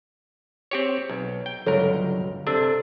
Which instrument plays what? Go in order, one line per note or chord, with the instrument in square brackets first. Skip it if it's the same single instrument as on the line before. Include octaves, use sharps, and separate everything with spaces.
[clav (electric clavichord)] C4 G4 C#5
B1
G5
[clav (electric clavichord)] G1 C#2 A#4 [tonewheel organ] D3 F#3
[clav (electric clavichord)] C3 D4 [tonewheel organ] A4